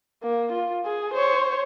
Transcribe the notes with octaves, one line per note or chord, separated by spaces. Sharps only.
A#3
F4
G#4
C5 C#5